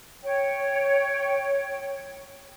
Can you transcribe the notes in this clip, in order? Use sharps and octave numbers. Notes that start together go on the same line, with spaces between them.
C#5 G5